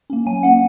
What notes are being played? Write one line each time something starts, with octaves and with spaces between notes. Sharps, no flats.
A#3 C#4
F#3 G#5
A#3 C#4 F#5